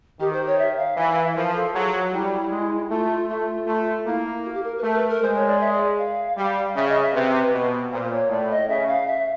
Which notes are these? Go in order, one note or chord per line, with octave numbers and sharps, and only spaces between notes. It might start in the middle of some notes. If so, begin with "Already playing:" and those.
D#3 G4
C5
C#5
E5
F5
E3 E5
F5
E5
F3 A#4
A4
F#3 G#4
F#4
G3 E4
G#3
A3 F4
A3 F4
A3
A#3 E4
F#4
G4
A#4
B4
A3 A#4
B4
A#4
G#3 C5
C#5
D5
E5
D5
F5
G3 F5
C#3 E5
D#5
E5
C3 B4
B2
A#2 C5
C5
C#5
A2 D5
D#5
C#3 E5
F5
E5